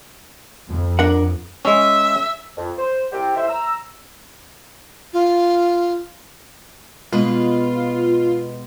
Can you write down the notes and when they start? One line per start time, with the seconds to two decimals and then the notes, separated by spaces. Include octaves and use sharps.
0.67 F2
0.99 D4 A#4 F#5
1.65 G#3 C#4 E5
2.56 F2
2.79 C5
3.12 C2 C3 G4
3.36 A2 C5 E5
3.48 A#5 E6
5.13 F4
7.12 B2 G#3 F4 B4